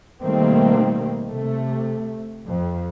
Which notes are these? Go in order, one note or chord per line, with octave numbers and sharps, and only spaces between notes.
B2 D#3 G3 A3 A#3 C4
C3 A3
F2